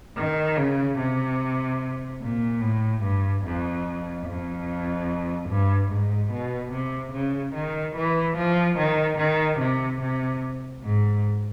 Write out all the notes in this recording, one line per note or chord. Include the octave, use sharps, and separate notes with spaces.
D#3
C#3
C3
A#2
A2
G2
F2
F2
G2
G#2
B2
C3
C#3
D#3
E3
F3
D#3
D#3
C3
C3
G#2